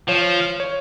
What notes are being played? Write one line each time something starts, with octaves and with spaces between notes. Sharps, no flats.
F3 C#5
C#5